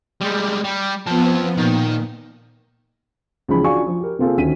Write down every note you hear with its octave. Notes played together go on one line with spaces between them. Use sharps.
G3 G#3
G3
F3 B3 C4 A5
A#2 D#3
C#2 E3 F3 C#4 D#4 B5
D4 F4 F#4 F5 G#5 C#6
F3
G4 A#4
C3 A#3 C4 F4 G#4 A4
D2 D#3 C#4 F#4 B6 D#7